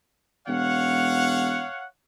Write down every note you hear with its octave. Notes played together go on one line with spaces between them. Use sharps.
E1 C#5 F5 F#5